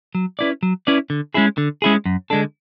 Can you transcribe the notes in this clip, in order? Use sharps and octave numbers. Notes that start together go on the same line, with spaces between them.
F#3
C#4 E4 B4 D5
F#3
C#4 E4 B4 D5
D3
G#3 C#4 E4 G#4
D3
G#3 C#4 E4 G#4
F#2
D3 G#3 D4 A4